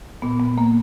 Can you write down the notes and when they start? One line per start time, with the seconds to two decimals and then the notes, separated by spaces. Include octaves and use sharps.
0.22 A#2 B3
0.40 B3
0.58 A#3